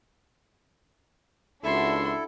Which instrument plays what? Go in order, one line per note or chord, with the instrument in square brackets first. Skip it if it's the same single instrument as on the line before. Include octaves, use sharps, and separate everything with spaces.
[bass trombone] C#2 [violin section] D4 F#4 [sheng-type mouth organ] E4 A4 [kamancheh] E5 C6